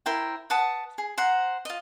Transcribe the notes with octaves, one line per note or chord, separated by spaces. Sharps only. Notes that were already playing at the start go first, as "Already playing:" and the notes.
E4 A#4 C5 G5
B4 F#5 A5 D#6
G#4
C5 F#5 A#5
F4 D#5